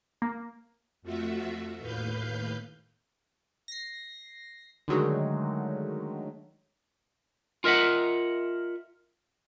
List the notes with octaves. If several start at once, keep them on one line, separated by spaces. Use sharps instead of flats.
A#3
F2 A3 F4 F#4 E5
D#2 A2 B4 F5 G6
A#6 C7
D3 D#3 F#3 G#3 A3
F4 A#4 D#5 E5 F#5